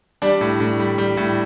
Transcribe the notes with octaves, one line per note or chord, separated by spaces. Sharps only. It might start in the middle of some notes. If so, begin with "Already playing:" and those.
G3 D4
A2
A2
G3
G3
A2